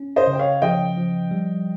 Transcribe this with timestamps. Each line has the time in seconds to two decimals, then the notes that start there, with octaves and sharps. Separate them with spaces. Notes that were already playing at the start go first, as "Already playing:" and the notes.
Already playing: C#4
0.16 C5 D#5
0.27 C#3
0.33 G5
0.39 C#5 F5
0.62 F3 D#5 G5
0.97 F3
1.31 G3